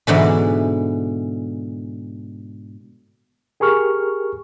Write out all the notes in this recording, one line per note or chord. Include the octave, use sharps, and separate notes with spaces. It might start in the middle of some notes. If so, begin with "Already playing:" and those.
G#2 B2 D3 E3
G4 G#4 A#4 C#6 F6